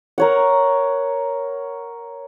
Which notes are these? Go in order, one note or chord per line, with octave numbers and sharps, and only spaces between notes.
A#4 C#5 F#5